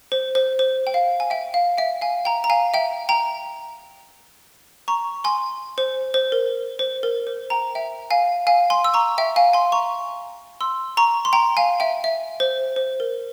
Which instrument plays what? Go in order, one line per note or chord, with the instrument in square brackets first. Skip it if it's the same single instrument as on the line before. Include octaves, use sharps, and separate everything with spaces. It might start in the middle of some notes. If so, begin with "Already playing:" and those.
[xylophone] C5
C5
C5
G5
F5
G#5
E5 G5
F5
E5 G5
F5 G#5
G5 A#5
A#5
F5 G#5
E5 G5
G5 A#5
A#5 C#6
G#5 C6
C5
C5
A#4
C5
A#4
C5
G5 A#5
E5 G5
F5 G#5
F5 G#5
G#5 C6
E6
A#5 C#6
E5 G5
F5 G#5
G#5 C6
A#5 C#6
C6 E6
A#5 C#6
C6
G5 A#5
F5 G#5
E5 G5
E5
C5
C5
A#4